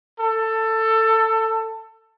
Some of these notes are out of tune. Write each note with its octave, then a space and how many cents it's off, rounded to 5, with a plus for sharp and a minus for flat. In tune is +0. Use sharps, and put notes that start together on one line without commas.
A4 +15